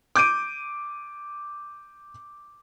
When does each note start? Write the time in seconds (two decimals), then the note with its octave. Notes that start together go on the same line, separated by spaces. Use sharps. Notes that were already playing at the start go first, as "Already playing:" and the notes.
0.15 D6 G6 D7 D#7